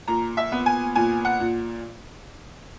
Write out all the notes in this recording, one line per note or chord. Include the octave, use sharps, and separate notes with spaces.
A#2 A#5
E5
B3
G#5
A#2 G#5
F#5
A#2